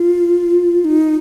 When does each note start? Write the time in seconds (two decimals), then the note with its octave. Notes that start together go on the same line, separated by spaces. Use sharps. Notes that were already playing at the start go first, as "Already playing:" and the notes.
Already playing: F4
0.85 D#4